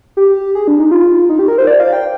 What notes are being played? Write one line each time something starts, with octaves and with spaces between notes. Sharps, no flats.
G4
G#4
D4
D#4
F4
D#4
G4
A#4
C5
D5
F5
G5